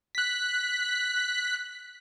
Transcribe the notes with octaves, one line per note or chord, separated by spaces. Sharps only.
F#6 B6